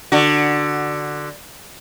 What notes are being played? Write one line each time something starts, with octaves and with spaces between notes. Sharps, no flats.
D3 F#4